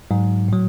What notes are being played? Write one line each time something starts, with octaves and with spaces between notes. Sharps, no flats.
G#2 F#3
A2 F#3